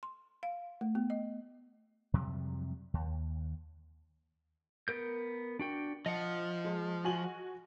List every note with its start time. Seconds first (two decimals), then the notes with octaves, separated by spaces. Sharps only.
0.03 C6
0.43 F5
0.81 A3
0.95 B3
1.10 D#5
2.14 F2 C3 F#3 G3
2.94 D#2
4.88 B3 A#4 G6
5.59 D4 F#4 G5
6.06 F3 D#5 F#5
6.65 G#3
7.04 F#4 G#5 F#7